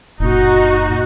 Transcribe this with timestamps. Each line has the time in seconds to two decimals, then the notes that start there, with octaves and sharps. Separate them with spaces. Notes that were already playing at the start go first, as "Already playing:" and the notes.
0.20 F#1 A#2 D#4 F#4